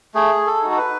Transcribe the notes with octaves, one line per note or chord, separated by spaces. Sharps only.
A3 G#4
A4
D#4 F#4
A4
B4